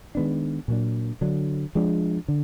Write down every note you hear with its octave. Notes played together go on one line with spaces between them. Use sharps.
D#3 G#3 B3 D4
A#2 F#3 A#3 D4
D3 F#3 D4
F3 G#3 D4
D3